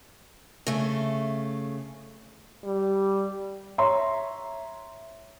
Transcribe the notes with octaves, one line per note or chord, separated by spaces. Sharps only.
C#3 A3
G3
C#5 E5 A#5 C6